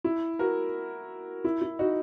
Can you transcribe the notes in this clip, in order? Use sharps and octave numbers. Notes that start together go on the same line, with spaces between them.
E4
F#4 A#4
E4
E4
D#4 F#4